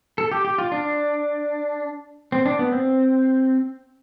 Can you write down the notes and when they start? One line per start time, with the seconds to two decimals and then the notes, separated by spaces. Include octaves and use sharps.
0.18 A4
0.31 G4
0.45 G4
0.58 F4
0.72 D4
2.32 C4
2.46 D4
2.59 B3
2.72 C4